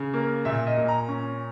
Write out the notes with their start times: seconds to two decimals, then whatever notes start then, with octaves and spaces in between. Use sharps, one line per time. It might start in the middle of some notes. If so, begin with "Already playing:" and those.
Already playing: C#3
0.13 A#3
0.45 A#2 E5
0.67 D#5
0.77 A#2
0.88 A#5
1.08 C#4